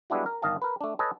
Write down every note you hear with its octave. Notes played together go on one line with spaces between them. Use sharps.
G3 G#3 B3 D4 E4 F#4
A#4
G1 D#3 D#5 F5 A5
A#4 B4
A3 D4
A4 B4 C#5 D#5 G#5 A5